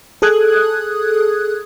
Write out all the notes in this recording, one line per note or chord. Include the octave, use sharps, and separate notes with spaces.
G#4 A4 D#6 F#6 G#6